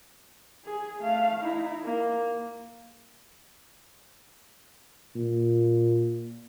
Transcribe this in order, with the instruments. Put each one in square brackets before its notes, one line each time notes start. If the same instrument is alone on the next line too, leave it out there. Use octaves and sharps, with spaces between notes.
[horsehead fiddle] G#4
A3 F5
D#4 E4
A#3
[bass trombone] A#2